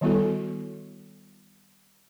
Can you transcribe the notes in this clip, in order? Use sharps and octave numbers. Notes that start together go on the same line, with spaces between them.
D#3 G3 B3 E4 F#4 A4